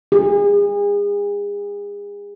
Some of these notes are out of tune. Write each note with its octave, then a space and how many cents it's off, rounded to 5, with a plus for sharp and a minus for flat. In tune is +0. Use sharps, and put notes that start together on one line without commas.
G#4 -35